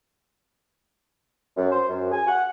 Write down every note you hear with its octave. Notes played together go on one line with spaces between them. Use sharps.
F#2
C5
F#2
G#5
F#5